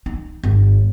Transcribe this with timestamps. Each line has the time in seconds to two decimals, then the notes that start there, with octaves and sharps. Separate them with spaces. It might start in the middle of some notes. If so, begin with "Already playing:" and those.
0.06 D#4
0.44 G1